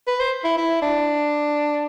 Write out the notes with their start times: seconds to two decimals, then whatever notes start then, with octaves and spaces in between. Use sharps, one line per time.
0.07 B4
0.20 C5
0.44 E4
0.57 E4
0.82 D4